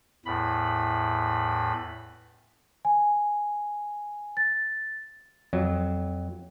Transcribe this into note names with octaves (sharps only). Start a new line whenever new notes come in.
E2 A2 B5
G#5
A6
F2 F#3